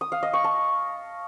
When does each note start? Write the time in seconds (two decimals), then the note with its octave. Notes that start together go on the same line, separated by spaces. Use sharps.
0.01 D#6
0.12 F5
0.23 D#5
0.33 C#6
0.44 A5